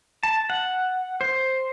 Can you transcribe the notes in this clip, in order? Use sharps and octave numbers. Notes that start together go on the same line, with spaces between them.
A5
F#5
C5